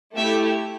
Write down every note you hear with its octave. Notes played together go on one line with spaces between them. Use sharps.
A3 E4 G4 E5